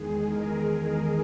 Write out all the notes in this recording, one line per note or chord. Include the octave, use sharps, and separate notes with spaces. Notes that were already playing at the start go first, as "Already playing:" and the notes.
Already playing: E2 D#3 G#3 G#4
A#4